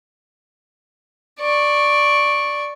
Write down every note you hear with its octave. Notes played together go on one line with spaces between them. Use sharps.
D5 C#6